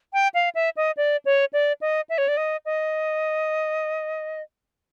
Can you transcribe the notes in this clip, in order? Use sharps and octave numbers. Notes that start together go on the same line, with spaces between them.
G5
F5
E5
D#5
D5
C#5
D5
D#5
E5
C#5
D5
D#5
D#5